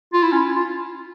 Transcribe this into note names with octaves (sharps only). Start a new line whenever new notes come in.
F4
E4
C#4
F4